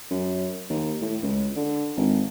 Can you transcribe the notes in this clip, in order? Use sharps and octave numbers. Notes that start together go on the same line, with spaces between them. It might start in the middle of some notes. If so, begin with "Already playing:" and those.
F#2
D#2
A2
C#2
D3
G#1